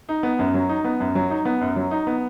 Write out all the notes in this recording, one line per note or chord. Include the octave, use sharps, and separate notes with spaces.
D#4
B3
F#2
F#3
D#4
B3
F#2
F#3
D#4
B3
F#2
F#3
D#4
B3